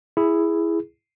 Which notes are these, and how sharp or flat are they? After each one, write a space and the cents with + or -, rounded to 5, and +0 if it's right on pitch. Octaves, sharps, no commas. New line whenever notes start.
E4 +5 G#4 +0